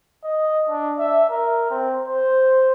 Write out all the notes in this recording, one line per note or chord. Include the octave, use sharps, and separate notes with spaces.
D#5
D4
E5
A#4
C4
C5